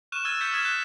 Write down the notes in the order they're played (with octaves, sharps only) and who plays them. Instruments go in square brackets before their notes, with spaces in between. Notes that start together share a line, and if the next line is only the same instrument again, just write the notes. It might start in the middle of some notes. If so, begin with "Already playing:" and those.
[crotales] C#6 F6 F#6 D#7 E7
E6 F6 G#6 A6 D#7
E6 G6 A6 B6 C#7
D#6 F6 G#6 B6 E7
F6 F#6